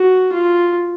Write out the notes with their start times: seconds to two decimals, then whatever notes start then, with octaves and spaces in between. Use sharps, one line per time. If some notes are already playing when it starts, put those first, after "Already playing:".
Already playing: F#4
0.33 F4